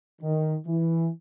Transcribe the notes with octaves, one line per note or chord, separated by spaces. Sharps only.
D#3
E3